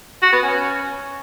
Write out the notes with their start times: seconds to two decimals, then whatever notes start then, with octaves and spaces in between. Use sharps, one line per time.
0.22 F#4
0.32 B3
0.43 C#4